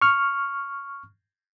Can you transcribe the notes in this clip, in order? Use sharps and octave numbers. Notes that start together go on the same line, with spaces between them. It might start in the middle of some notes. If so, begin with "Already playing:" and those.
C#6 F6